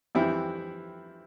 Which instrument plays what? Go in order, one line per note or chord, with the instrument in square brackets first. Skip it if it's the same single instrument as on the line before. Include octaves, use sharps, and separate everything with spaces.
[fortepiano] F2 E3 G3 C4 E4